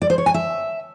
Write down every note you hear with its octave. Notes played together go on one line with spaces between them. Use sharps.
D5
C5
C#5
G#5
E5